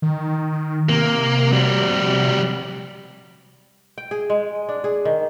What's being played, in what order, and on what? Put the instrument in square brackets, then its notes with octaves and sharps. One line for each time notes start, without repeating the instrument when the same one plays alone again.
[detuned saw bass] D#3
[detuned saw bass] C3 [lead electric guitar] A#3
[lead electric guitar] G3 F#4
[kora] G5
G#4
G#3
D4
G#4
D#3